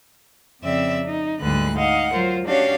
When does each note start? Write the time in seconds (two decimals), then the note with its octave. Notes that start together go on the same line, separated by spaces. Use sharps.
0.61 F2 C#3 C4 D5 E5 E6
1.03 D#4
1.41 D2 G#2 D3 G3 B4 F#6
1.77 D#4 D#5 F5 F#5
2.11 F#3 F4 A#4 C5
2.45 C#4 D4 F#4 G4 C#5 F5